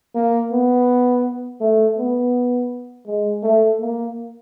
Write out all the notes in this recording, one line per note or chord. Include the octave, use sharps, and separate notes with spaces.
A#3
B3
A3
B3
G#3
A3
A#3